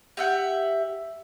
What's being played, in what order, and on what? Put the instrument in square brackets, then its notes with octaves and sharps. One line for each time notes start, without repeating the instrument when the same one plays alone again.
[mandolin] G4 E5 F#5